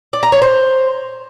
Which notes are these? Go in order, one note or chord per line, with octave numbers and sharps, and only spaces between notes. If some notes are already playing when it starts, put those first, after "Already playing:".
D5
A#5
C#5
C5